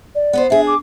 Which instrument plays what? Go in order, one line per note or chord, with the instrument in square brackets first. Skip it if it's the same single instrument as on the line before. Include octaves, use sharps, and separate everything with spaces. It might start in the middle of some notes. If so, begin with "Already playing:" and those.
[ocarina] D5
[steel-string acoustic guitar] B3 B4 C5
[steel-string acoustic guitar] D4 G#4 [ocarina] E5
[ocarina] D6